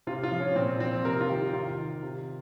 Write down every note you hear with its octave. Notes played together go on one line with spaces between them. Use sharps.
C3 F4
F4
F3
C#4
A#2 C4
F3 C4
C3 A#4
F4
D#3 G4
C3 F4
D#3
C3